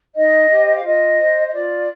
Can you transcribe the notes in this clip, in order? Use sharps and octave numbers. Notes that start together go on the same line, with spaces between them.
D#4 D#5
G4 C5
F5
F4 D#5
C5
D#5
F4 D5